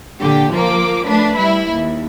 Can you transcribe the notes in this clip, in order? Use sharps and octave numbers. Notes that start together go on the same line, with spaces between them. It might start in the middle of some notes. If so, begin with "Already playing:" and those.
A#2 D3 G4
F3 A#3 D6
A3 D4 B4
G3 E4
D#2